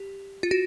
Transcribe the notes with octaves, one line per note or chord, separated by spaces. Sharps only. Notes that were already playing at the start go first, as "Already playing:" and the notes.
Already playing: G4
F4
F#4